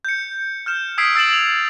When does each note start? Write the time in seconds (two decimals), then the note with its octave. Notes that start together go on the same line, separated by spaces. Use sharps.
0.05 G6 C#7
0.66 F6 G6 E7
0.98 D#6 E6 G#6 B6 C7 D7
1.15 E6 A6 D7 E7 F#7
1.33 F7